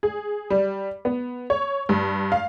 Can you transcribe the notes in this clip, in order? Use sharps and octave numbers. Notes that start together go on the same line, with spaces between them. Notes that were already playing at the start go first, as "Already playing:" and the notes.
G#4
G3
B3
C#5
G2
F5